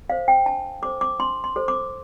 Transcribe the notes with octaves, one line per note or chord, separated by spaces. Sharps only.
A4 C5 F5
G5
D4 A5
A4 C5 D6
D6
D4 C6
C6
A4 C5
D6